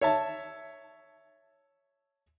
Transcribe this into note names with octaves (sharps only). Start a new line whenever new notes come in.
C#5 E5 A5